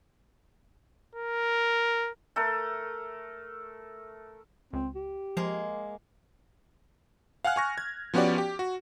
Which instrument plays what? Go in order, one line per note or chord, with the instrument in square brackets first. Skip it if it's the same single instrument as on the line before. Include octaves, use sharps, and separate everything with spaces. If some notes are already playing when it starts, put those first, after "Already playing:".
[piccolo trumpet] A#4
[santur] A3 A4 A#4
[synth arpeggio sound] C#2 [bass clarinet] C4
[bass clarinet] G4
[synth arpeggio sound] F3 [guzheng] G#3 A#3
[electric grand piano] F5 F#5 G#5 F6 F#6
G#5 C#6 A#6
G#6
F3 B3 C#4 F#4 G4 D5
G4
F#4